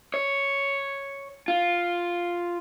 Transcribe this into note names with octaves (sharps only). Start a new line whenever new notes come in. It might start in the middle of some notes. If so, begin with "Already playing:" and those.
C#5
F4